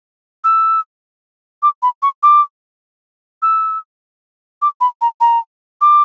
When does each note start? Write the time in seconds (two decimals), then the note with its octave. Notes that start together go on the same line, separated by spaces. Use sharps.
0.44 E6
1.63 D6
1.82 B5
2.03 C#6
2.23 D6
3.42 E6
4.62 D6
4.81 B5
5.01 A#5
5.21 A#5
5.81 D6